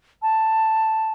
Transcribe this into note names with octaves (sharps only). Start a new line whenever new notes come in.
A5